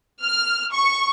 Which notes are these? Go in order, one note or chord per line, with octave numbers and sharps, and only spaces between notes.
F6
C#6